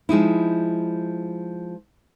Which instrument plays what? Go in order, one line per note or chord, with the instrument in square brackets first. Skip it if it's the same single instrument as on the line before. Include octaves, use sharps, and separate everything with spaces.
[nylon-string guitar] F3 G#3 D#4 E4